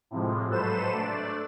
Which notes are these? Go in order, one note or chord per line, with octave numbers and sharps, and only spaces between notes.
A2 C3 F3 G#3
G#2 F#3 A4 B4 C5 E7
A3 D4 D5